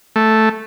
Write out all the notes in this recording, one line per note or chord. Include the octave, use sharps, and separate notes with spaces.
A3